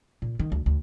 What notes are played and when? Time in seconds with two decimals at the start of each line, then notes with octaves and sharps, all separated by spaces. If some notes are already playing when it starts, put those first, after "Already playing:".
0.22 A#2
0.39 D#3
0.52 D2
0.66 D2